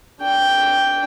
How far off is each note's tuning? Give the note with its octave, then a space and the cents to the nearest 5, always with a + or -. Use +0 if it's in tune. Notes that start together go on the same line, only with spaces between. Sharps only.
D4 -25 G5 +0